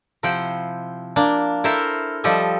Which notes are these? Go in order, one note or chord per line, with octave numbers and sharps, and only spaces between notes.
C3 F3 E4 C5 F#5 G5
A#3 D4
E4 A4 A#4 C5 E5
F3 G3 G4 A4 D#5 E5